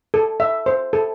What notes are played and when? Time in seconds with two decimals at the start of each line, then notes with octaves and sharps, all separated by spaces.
0.14 A4
0.40 E5
0.66 C5
0.93 A4